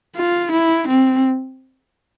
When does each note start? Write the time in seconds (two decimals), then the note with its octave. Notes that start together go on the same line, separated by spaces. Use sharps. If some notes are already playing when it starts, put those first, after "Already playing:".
0.16 F4
0.52 E4
0.88 C4